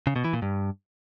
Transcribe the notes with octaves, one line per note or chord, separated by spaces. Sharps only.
C#3
B2
E3
A#2
G2